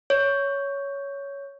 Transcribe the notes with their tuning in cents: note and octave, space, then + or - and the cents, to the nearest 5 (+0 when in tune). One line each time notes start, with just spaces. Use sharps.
C#5 +10